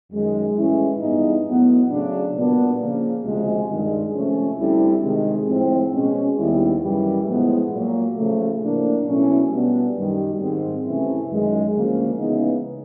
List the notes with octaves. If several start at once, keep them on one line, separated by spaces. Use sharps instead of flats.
F#2 D#3 G#3
A2 E3 G#3 C#4 E4
G2 E3 G#3 B3 D#4
A2 F#3 B3
C#3 F#3 A3 D4
A#2 G3 B3 D4
C#3 F3 A#3
D2 C3 F3 G#3
G2 D#3 G#3
C3 F3 A3 C#4
D2 D3 G3 C4 E4
C3 D#3 G#3
A2 F3 G#3 C4
B2 G#3 C#4
D#2 D#3 G3 B3 E4
F#2 C#3 E3 G3
A2 F3 G#3 B3
A#2 F#3 A#3
C#3 F3 A3
A2 F3 A#3 D4
B2 F#3 A3 C#4 E4
B2 G3 B3 D4
F#2 D#3 G3
G#2 D#3 G#3 C4
C3 E3 A3 C#4 E4
F#2 D#3 G#3
D2 C#3 F3 A#3 C#4
C#3 E3 G#3 B3 D#4